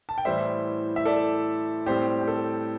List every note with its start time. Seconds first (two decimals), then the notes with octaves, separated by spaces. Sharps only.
0.09 A5
0.18 G5
0.25 A2 E3 G3 C5 E5
0.96 E5
1.05 A4 D5
1.86 A2 G3 C4 G4 C5
2.21 G4
2.28 A4